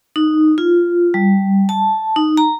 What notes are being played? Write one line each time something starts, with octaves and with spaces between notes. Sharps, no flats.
D#4
F4
G3
A5
D#4
A#5